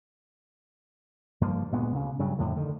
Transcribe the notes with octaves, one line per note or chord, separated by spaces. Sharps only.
G2 F3 A#3
D2 A#2 G#3 B3
D2 C#3
G2 C#3 F#3
F2 A2 D3
D3 D#3